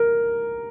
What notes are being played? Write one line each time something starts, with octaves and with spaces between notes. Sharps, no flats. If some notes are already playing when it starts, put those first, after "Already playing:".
Already playing: A#4